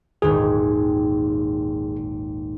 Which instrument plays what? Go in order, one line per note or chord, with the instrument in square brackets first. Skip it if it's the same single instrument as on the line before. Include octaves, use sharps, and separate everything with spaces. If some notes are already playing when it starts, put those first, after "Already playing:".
[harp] D#1 G#1 [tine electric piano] G#4